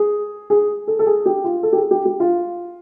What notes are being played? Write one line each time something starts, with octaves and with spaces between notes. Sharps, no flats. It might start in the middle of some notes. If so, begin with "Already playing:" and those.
Already playing: G#4
G#4
A4
A4
G#4
G4
F4
A4
G4
G#4
G4
G4
F4